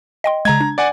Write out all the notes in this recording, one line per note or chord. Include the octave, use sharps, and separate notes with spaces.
D#5 G5 C6
C#3 G#3 A#5 G#6
D4
D5 F#5 G#5